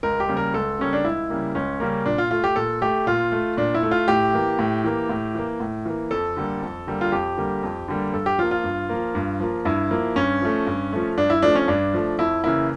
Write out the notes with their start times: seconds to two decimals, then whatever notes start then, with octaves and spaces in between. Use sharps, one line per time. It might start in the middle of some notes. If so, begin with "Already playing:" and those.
0.03 C#2 A#4
0.20 G4
0.28 C#3 G3 A#3
0.37 A#4
0.54 C#2 A4
0.79 C#3 G3 A#3 C#4
0.93 D4
1.04 C#2 E4
1.30 C#3 G3 A#3
1.55 C#2 C#4
1.80 C#3 G3 A#3
2.05 A#2 D4
2.18 F4
2.31 A3 F4
2.44 G4
2.56 A#2 A4
2.82 A3 G4
3.07 A#2 F4
3.32 A3
3.57 A#2 D4
3.74 E4
3.83 A3
3.91 F4
4.08 A2 G4
4.34 E3 A#3
4.59 A2
4.84 E3 A#3
5.09 A2
5.35 E3 A#3
5.60 A2
5.85 E3 A#3
6.11 F2 A4
6.36 D3 G3 A#3
6.62 F2
6.87 D3 G3 A#3
7.01 F4
7.12 F2 G4
7.37 D3 G3 A#3
7.63 F2
7.88 D3 G3 A#3
8.13 G2 A4
8.26 G4
8.39 F3 F4
8.43 A#3
8.51 F4
8.64 G2
8.90 F3 A#3
9.15 G2
9.40 F3 A#3
9.65 G2 E4
9.91 F3 A#3
10.16 G2 C#4
10.41 F3 A3
10.67 G2
10.93 F3 A3
11.17 G2 D4
11.30 E4
11.42 F3 A3 D4
11.55 C#4
11.68 G2 D4
11.94 F3 A3
12.18 F2 E4
12.44 C#3 E3 A#3 E4